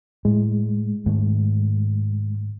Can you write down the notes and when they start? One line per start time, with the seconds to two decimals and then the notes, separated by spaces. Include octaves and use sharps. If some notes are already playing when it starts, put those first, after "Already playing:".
0.25 A2 G#3
1.06 G#2 D#3 A3